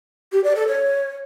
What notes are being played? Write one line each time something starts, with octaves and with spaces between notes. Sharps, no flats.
G4
D5
A4
C#5